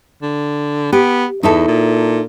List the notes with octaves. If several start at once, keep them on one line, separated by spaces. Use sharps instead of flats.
D3
B3 G4
E2 D#4 E4 A4
A#2